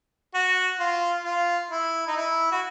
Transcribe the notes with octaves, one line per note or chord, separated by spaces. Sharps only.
F#4
F4
F4
E4
D#4
E4
F#4